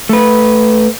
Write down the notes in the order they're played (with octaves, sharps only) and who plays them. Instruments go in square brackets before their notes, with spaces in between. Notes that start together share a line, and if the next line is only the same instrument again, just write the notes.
[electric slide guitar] A3 B4